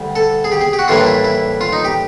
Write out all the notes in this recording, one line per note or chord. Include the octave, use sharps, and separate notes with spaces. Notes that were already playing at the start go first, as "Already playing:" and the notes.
Already playing: D2 G3
A4
G#4
G4
G#4
G4
F#4
A2 E3 G3 A#3 D4 F4
E4
E4
F4
D#4
G4